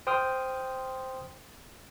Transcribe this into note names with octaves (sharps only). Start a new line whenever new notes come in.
C5 G5 C6 D#6 F6